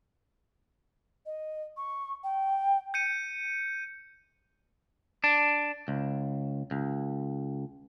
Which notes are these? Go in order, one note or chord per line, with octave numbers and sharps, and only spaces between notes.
D#5
C#6
G5
G6 C#7 D#7
D4
C#2
C#2